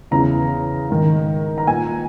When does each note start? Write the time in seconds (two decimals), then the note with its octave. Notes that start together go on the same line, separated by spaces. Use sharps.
0.11 E2 C#3 E3 A#5
0.90 G#2 D#3
1.58 A#5
1.67 A#2 G#5